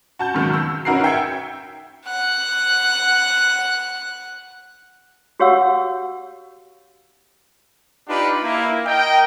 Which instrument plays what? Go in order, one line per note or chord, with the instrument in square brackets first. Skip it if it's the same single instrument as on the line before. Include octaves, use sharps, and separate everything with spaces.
[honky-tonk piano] F#4 A5 G6
C#2 B2 D#3 F#3
E6
C#4 D#4 F#4 A#4 B4 C7
E5 G5 E6 G#6 C#7
[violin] F#5 F#6
[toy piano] F#4 G4 C#5 F5 F#5 E6
[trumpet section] D4 D#4 F4 G4 B4
A#3 E4
A#4 D#5 G5